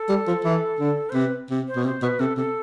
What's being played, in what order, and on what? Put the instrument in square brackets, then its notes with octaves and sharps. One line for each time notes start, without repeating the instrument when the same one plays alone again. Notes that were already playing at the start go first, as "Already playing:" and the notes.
Already playing: [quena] A4
[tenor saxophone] G3
F3
E3
D3
[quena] C5
[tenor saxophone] C3 [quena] B4
[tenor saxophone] C3
[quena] C5
[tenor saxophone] B2
[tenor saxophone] C3 [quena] C5
[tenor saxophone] B2 [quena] B4
[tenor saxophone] C3 [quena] A4
[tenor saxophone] C3 [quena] A4